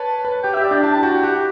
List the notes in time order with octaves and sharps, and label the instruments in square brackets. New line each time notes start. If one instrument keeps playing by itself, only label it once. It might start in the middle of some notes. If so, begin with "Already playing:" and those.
Already playing: [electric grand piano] B4 C#5 [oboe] A5
[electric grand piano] B4
[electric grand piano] G4 [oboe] G5
[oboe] E5
[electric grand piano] G4
[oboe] D5
[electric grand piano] D4 [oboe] G5
[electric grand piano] E4 [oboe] A5
[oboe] A5
[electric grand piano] F#4 [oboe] G5
[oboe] G5
[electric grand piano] G4 [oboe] F#5